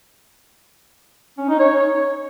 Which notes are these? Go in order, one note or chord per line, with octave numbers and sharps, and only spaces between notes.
C#4
D#4
C#5